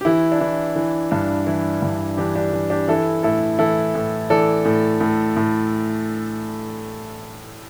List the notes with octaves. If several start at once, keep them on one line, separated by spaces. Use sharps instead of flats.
G4
E3 E4
D4
E3 E4
E3
G2 D4
E3 E4
G2
E3 D4 G4
D4 G4
E3
D4 G4
E3 E4 A4
A2 E4 A4
E3 E4 A4
A2
E3 A4 D5
A2
A2
A2